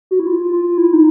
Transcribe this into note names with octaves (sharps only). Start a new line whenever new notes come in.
F#4
E4
F4
F4
E4
D#4